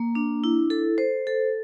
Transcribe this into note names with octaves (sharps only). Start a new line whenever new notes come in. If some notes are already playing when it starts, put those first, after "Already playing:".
Already playing: A#3
D4
E4
A4
C5
A4